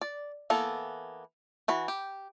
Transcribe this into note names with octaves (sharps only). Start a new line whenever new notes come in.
D5
E3 A#3 B3 A4
E3 F#4 B5
G4